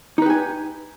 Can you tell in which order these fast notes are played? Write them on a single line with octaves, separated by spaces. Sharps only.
D#4 B4 G4 G#5